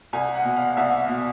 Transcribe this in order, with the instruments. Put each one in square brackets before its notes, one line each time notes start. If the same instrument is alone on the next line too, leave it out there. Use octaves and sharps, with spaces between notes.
[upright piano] C2 G#5
F#5
B2
F5
C2 E5
B2